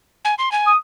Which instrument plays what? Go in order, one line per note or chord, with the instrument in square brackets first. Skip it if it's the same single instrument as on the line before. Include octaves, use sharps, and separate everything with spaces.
[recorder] G#5
C6
G#5
[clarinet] D#6